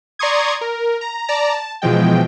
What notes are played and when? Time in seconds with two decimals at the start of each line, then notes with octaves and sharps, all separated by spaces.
0.19 D5 A#5 C6 C#6 D#6 G#6
0.61 A#4
1.01 A#5
1.28 D5 A5 A#5
1.53 A5
1.82 B2 E3 F3 G#3 G5